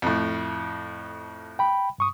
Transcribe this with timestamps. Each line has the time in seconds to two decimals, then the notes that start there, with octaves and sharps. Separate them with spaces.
0.02 F2 A2
1.59 G5 B5
1.98 G2 C#6 D#6